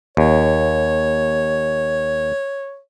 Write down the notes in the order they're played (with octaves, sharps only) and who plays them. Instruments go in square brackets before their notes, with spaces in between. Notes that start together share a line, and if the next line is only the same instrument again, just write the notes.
[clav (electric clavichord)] D#2 [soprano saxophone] C#5